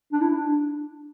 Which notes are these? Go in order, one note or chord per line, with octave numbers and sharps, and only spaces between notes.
D4
E4
D4